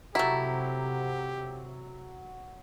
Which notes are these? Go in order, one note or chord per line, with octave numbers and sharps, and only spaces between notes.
C3 F#3 A3 E4 G4